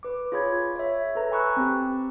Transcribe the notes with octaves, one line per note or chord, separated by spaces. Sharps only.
B4 D6
F4 G#4 C#5 B5 G#6
C#5 E5
A4 B4 A#5
G#5 B5 C#6 E6 F#6
C4 G4